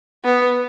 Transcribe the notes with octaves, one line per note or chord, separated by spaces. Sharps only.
B3